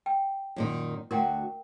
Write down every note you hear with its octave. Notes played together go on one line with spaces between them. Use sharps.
G5
F#2 A#2 D#3
D2 F#4 A#4 F#5 G5